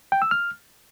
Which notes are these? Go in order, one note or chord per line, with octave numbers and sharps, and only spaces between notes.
G5
E6
F6